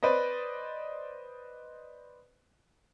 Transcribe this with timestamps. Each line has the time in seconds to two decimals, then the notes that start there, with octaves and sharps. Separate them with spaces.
0.03 B4 C5 D5 D#5